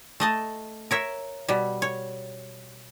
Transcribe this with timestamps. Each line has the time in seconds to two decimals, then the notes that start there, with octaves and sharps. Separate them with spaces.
0.20 A3 D#5 A5
0.91 A#4 C#5 E5
1.48 B2 G3
1.82 C#5